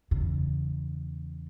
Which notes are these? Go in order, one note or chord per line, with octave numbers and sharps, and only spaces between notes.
E2 C#3